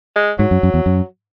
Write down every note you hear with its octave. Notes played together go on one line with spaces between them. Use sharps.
G#3
G#2 F#3
F#2
F#2
E2
F#2